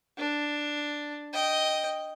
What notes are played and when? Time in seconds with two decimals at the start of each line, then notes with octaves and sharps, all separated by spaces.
0.18 D4
1.33 D#5 G5